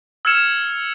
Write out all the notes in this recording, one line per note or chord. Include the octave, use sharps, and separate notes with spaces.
E6 F6 G#6 C#7 E7 F7